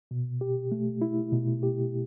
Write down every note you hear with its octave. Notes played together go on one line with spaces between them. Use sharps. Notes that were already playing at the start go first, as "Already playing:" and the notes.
B2
G4
A3
E4
B2
G4